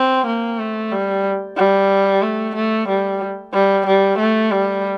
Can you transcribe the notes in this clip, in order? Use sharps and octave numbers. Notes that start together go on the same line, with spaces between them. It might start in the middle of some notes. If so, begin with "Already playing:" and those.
Already playing: C4
A#3
A3
G3
G3
A3
A3
G3
G3
G3
A3
G3